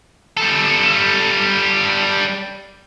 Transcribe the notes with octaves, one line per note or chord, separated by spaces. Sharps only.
G3 A4